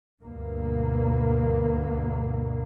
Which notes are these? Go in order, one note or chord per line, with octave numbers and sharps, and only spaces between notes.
D2 G2 B2 A#3 B3